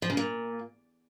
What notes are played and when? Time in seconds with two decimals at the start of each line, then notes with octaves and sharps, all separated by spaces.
0.02 F3
0.10 C#3
0.17 A#2